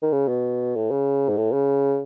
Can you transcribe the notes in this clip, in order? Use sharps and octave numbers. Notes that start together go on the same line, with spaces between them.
D#3
C#3
B2
A2
C#3
G#2
A2
C#3